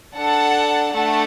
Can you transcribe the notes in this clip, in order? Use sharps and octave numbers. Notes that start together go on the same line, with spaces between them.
D4 A4 F#5 A5
A3 D4 A4 F#5 A5